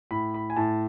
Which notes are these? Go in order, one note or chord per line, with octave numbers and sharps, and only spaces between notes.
A2 B5
B5
G#5
A2 A5